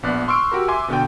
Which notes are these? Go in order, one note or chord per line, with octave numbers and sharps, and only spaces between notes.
A#1 B3 D5 F#6
C6 C#6 E6 F6 D7
F#4 G4 A#4
E5 G#5 C6 D6
B2 D3 A4 G5